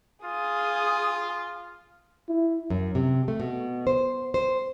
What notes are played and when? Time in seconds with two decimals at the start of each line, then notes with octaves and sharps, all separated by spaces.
0.24 F4 G#4 D#6
2.29 E4
2.70 F#2
2.95 C3
3.28 A3
3.40 B2
3.87 C5
4.34 C5